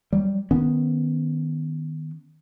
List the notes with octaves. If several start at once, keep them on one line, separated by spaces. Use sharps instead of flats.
F#3 G3
D#3 B3 C#4